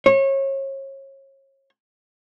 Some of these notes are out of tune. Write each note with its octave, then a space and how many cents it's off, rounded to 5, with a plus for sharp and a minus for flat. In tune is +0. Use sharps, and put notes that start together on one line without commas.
C#5 -30